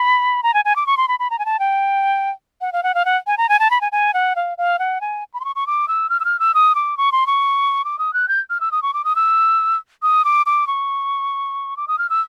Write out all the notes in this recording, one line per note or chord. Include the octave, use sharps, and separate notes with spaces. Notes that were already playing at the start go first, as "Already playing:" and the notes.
Already playing: B5
A#5
G#5
G#5
D6
C#6
C6
B5
B5
A#5
G#5
A5
G5
F#5
F5
F#5
F5
F#5
G#5
A#5
G#5
A5
B5
G#5
G#5
F#5
F5
F5
F#5
G#5
B5
C6
C#6
C#6
D6
E6
F6
E6
F6
E6
D#6
D6
C#6
C6
C#6
D6
D#6
F#6
G6
F6
E6
D#6
C#6
D6
D#6
E6
D#6
D6
D6
C#6
D6
D#6
F6
E6